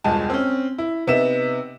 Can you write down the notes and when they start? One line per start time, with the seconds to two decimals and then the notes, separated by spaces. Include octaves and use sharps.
0.04 E1 C#2 G2 G#3 G#5 A5
0.30 C4 C#4
0.78 E4
1.07 C3 B3 D#4 E5 E7